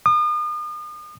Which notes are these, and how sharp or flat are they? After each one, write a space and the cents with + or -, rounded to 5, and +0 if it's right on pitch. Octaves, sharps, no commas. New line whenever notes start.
D#6 -40